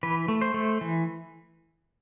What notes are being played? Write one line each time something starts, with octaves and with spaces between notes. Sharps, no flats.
E3 B4
A3
C5
A3
E3